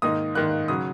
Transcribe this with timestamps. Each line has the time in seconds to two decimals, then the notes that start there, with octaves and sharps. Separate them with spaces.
0.02 G#2 D#3 A#3 D#4 D#6
0.35 G#2 D#3 A#3 D#4 F#6
0.68 C#3 F#3 D#6